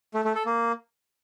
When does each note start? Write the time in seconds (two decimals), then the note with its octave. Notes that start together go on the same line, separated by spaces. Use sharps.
0.14 A3
0.25 A3
0.35 A4
0.46 A#3